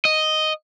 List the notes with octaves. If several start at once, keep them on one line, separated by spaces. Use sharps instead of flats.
D#5